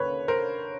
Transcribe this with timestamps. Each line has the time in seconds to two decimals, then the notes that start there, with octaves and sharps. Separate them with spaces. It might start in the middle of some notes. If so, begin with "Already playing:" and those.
Already playing: D#2 D3 B4 C#5
0.28 A#4 C5